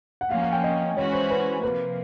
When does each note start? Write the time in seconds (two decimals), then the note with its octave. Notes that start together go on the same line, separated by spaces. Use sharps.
0.21 F#5
0.31 F3 A#3 C#4 F5
0.42 F#5
0.52 G5
0.64 D#5
0.97 E3 G#3 C#4 F#4 C#5
1.13 C5
1.30 B4
1.63 C3 F3 A#3 B4